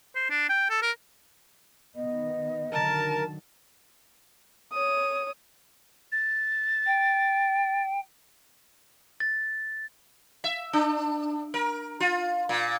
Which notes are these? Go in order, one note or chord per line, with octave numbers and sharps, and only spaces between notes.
C5
D4
G5
A4
A#4
D#3 B3 D#5
D3 D#3 F#3 A#4 A5
C#5 D#6
A6
G5
A6
E5
D4
A#4
F4
A#2